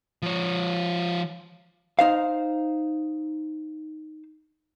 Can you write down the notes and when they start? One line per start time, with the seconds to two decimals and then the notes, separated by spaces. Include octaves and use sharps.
0.22 F3 C#5
1.99 D#4 C5 F5